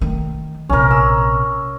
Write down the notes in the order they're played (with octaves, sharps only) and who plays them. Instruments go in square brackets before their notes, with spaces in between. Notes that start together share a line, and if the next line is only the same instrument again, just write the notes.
[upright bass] D#3 A3
[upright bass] A#1 C3 [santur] C#4 A#4
[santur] E6